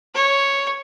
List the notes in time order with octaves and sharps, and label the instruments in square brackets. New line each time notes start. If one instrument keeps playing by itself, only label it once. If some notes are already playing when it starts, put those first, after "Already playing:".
[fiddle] C#5